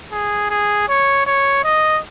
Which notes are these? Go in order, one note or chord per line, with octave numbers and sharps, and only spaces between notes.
G#4
G#4
C#5
C#5
D#5